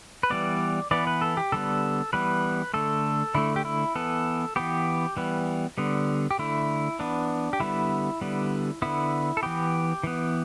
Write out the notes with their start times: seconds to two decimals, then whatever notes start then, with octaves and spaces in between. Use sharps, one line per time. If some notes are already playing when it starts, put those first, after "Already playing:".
0.23 B4
0.30 E3 G3 B3 D5
0.91 E3 B3 D5
1.07 B4
1.21 A4
1.37 G4
1.52 D3 G3 B3 A4
2.13 E3 G3 B3 B4
2.74 D3 A3 A4
3.35 D3 A3 E4
3.56 G4
3.65 E4
3.95 E3 B3 A4
4.56 E3 B3 G4
5.17 E3 G3 B3
5.78 D3 G3 B3
6.31 G4
6.39 D3 A3 E4
6.99 E3 B3 D4
7.53 G4
7.60 D3 G3 B3 E4
8.21 D3 G3 B3
8.82 D3 B3 E4
9.37 A4
9.43 E3 B3 G4
10.04 E3 B3